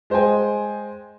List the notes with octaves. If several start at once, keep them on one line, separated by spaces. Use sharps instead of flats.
G#3 C5 D#5 G5 G#5